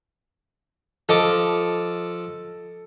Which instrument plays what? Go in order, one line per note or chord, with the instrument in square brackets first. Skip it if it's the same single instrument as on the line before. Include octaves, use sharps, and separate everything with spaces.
[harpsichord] F3 D#5 D6 [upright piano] A4